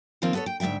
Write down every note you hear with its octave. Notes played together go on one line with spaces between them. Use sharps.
D#3 F3 A#3 C4 F4
B3 A4 C#5
G5
D2 G#2 G#3 E5 G5